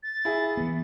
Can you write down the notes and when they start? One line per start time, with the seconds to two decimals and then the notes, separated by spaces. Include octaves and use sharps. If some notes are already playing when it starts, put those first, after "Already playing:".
0.03 A6
0.25 E4 G#4
0.57 E3 B3